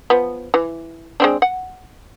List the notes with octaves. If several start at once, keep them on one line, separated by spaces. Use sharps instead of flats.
F3 B3
E3
G#3 C4 D4
F#5